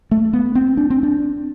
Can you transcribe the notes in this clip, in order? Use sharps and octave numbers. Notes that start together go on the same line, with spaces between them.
A3
B3
C4
D4
C4
D4